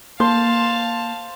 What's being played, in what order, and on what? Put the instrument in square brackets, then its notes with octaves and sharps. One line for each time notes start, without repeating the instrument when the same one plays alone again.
[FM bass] A#3 [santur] C5 [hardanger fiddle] F5 A5